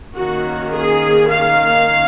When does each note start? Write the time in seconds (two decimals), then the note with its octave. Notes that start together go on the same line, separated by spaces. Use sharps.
0.15 D#3 A#3 C#4 F#4
0.71 G#4
1.28 F5